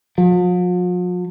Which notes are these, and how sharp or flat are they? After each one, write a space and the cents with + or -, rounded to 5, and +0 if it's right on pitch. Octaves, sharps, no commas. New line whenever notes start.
F3 +45